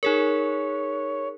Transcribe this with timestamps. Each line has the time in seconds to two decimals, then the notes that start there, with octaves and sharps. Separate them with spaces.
0.03 D#4 G#4 A#4 C#5